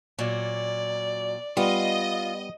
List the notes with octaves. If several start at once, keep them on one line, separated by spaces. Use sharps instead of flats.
A#2 F#3 D5
G3 B3 F4 D#5